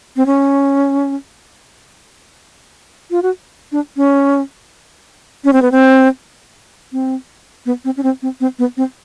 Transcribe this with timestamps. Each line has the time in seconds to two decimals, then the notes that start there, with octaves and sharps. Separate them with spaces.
0.17 C4
0.26 C#4
3.11 F4
3.22 F#4
3.72 D4
3.97 C#4
5.45 C#4
5.53 C4
5.62 B3
5.72 C4
6.92 C4
7.66 B3
7.85 C4
7.97 C#4
8.03 C4
8.22 C4
8.40 C4
8.59 B3
8.77 C4